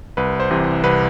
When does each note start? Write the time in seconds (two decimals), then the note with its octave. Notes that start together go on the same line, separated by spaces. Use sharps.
0.17 C2 B4
0.40 C5
0.51 C3 E3
0.84 C2 B4